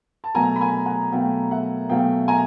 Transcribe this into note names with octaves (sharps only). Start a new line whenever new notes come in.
A5
B2 F#3 A3 G#5 A#5
B5
G#5 A#5
F#5 G#5
B2 F#3 A3 F5 G5
E5 F#5
B2 F#3 A3 F5 G5
G#5 A#5